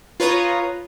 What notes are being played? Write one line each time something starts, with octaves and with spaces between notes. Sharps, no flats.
F4 B4 C#5 A#5 D#6